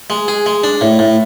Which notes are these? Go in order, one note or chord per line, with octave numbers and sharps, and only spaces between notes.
G#3
G#4
G#3
D4
A2
A2